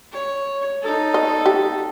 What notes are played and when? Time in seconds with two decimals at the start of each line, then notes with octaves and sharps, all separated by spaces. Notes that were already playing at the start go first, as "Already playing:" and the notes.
0.13 C#5
0.83 D#4 A4
1.14 D#5
1.46 G4